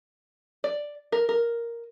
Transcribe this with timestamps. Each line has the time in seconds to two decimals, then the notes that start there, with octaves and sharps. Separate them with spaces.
0.64 D5
1.12 A#4
1.29 A#4